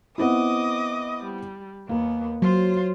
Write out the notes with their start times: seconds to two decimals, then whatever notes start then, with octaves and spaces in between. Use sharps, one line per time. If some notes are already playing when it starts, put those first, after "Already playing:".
0.18 B3 C4 E4 D#5 D6 D#6
1.25 G3
1.89 D#2 A#3 B3
2.42 F#3 F4 C5